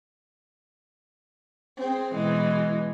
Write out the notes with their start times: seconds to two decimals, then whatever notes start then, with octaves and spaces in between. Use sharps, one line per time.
1.79 C4 G#4
2.14 B2 E3 G#3